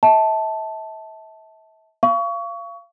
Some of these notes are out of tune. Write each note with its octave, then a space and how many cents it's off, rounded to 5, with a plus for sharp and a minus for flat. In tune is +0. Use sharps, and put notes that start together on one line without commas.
E5 -35 A5 +0
F5 -30 C#6 +25